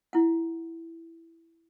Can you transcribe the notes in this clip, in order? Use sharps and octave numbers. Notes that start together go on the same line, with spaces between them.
E4 F#5